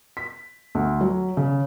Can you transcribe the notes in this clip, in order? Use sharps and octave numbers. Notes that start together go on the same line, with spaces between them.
B6
D2
F#3
C#3